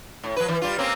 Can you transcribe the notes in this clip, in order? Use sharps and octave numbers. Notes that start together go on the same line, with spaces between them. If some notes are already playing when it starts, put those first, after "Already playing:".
A2
F3 B4
E3
G3 F4
A#3 C4 C#4